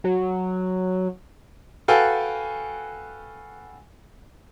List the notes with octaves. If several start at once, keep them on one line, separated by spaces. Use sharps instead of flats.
F#3
F#4 A4 B4 F5 G5 G#5